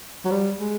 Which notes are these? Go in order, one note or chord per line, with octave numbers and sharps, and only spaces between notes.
F#3
G3
G#3